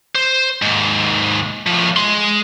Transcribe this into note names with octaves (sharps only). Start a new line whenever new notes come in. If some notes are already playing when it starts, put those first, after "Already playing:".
C5
D#2 G#2
A2 F3
G#3 C6